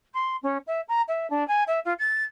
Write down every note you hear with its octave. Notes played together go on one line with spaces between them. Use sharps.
C6
C#4
E5
A#5
E5
D4
G#5
E5
F4
A6